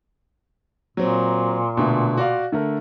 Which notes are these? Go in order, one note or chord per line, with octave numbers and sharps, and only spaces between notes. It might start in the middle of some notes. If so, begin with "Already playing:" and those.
A#2 F#3 C4
B2 D3 A3
F#4 D5 F5
D3 A3 A#4